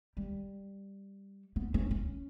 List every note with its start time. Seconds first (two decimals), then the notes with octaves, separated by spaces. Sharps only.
0.17 G3
1.56 B3
1.74 C#4
1.91 C#4